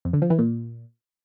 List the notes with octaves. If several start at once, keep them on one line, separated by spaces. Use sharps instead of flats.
F2
D3
F3
E3
A#2